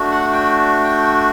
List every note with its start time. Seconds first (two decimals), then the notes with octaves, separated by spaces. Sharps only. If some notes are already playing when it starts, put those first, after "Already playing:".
Already playing: A3 D4 F#4
0.12 F#5
0.33 G5
0.84 G5